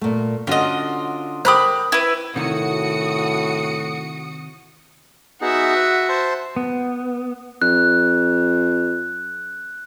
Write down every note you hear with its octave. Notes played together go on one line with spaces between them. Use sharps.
A#2 A3
D3 C#4 F4 F#4 D#5
G4 A#4 C5 B5 D#6 F#6
E4 B4
A2 C3 D#3 F#4 D#6 C#7
B3 D#4 F#4 G#4 E5
B4
C5 A5 C6
B3
F2 F#6